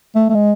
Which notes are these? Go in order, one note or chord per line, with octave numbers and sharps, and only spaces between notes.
A3
A3
G#3